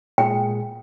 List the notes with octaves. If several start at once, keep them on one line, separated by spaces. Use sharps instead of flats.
A#2 G#3 G#4 G5